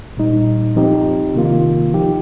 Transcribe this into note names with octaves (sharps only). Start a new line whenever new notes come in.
A#2 G3 D#4
F3 C4 D#4 G4
C3 D#3 A#3 F4
F3 D#4 G4